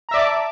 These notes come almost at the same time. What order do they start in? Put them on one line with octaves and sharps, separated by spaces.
A#5 E5 D5 D6 A5